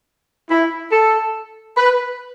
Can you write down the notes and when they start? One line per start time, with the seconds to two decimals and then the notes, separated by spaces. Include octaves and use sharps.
0.50 E4
0.92 A4
1.77 B4